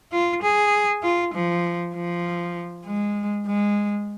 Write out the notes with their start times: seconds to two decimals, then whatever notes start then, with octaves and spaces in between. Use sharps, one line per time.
0.12 F4
0.42 G#4
1.03 F4
1.34 F3
1.95 F3
2.85 G#3
3.46 G#3